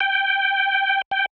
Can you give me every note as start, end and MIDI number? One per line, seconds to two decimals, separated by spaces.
0.01 1.02 79
1.11 1.26 79